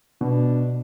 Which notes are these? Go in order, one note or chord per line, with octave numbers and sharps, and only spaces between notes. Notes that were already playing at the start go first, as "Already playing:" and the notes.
B2 D4